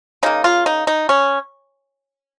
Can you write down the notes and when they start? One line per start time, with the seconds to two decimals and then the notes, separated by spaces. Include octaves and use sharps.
0.23 C#3 A#3 D#4
0.44 F4
0.66 D#4
0.87 D#4
1.09 C#4